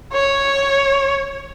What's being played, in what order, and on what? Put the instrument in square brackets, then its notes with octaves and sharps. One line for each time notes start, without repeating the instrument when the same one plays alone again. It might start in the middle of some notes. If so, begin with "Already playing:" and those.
[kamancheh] C#5